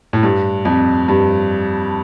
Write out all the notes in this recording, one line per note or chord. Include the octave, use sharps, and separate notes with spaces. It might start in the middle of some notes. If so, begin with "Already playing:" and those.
A2
G2
F2
G2